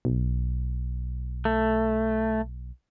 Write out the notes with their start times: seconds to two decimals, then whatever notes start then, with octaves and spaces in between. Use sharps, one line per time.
0.05 B1
1.45 A3